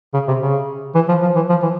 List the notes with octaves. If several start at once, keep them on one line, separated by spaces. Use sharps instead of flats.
C#3
C3
C#3
E3
F3
F3
E3
F3
E3